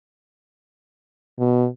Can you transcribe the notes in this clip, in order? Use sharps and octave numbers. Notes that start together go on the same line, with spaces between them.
B2